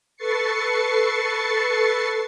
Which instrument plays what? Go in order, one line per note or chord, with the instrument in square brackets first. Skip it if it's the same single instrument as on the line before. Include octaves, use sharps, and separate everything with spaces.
[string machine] A4 B4 C#6 A6 C7 C#7